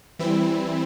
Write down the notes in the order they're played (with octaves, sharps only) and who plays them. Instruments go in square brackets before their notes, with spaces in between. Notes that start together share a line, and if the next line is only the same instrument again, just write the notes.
[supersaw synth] E3 G3 C4 E4